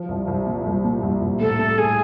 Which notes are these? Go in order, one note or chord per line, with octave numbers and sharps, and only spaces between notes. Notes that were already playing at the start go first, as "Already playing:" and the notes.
Already playing: F3
C2
C2
A#2
C2
A#2
C2
C2
A2 A4
A3
A2 G#4